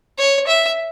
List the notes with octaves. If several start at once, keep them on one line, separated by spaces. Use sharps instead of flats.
C#5
E5